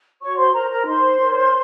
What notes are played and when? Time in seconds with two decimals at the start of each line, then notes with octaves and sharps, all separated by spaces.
0.21 F#4 C#5 C#6
0.37 C5 C6
0.53 A#4 C5 A#5
0.69 A#4 A#5
0.81 A#5
0.86 D#4 C5 C6
1.18 A#4 C#5